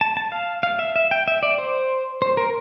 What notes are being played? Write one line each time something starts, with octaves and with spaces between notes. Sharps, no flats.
A5
A5
F5
F5
E5
E5
G5
E5
D5
C5
C5
A#4